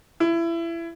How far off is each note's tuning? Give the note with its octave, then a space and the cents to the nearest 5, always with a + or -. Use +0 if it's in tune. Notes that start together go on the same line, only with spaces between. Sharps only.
E4 +25